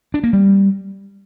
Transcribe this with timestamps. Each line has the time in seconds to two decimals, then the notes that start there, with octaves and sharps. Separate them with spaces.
0.14 D4
0.24 A#3
0.33 G3